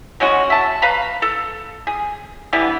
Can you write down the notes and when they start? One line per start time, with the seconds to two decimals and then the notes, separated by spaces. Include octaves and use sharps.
0.20 F#3 G#3 C#4 F#4
0.50 E5 A5
0.82 B4 F5 A#5 B5
1.22 A4
1.87 G#4
2.53 D3 E3 G3 B3